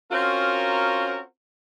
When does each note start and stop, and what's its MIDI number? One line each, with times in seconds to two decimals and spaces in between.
0.12 1.20 60
0.12 1.20 61
0.12 1.20 65
0.12 1.20 66
0.12 1.20 70